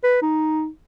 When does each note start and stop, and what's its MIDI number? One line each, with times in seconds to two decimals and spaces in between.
0.03 0.17 71
0.22 0.68 63